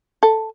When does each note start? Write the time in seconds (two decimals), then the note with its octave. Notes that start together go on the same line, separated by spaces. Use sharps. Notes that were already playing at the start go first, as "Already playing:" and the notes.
0.23 A4